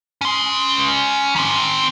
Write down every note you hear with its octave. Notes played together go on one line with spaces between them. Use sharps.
C#4 C6
D#3 C4